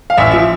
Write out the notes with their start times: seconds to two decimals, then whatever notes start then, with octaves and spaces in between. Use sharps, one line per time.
0.10 F5
0.17 A1 E5
0.31 F3 E5